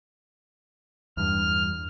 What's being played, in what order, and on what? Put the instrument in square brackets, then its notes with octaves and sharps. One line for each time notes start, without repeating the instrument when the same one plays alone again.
[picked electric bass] E2 G2 [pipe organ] F6